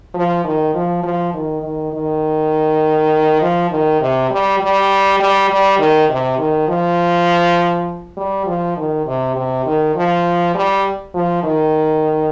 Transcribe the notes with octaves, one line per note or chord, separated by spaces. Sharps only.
F3
D#3
F3
F3
D#3
D#3
D#3
F3
D#3
C3
G3
G3
G3
G3
D#3
C3
D#3
F3
G3
F3
D#3
C3
C3
D#3
F3
G3
F3
D#3